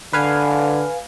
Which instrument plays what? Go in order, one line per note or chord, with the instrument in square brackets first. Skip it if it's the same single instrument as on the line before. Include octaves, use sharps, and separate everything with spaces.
[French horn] D3 [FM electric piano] B4 F5 G#5